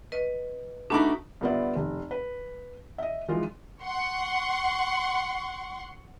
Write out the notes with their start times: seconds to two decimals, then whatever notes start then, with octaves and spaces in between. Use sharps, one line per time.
0.12 B4 D#5
0.90 A3 D4 D#4 F#4 A5 B5 D6 F#6
1.41 G2 D3 B3 F4 D5 E5
1.76 F1
2.11 B4
2.98 D#5 E5
3.28 E3 F3 G#3 D#4 F4
3.83 F#5 C6 C#6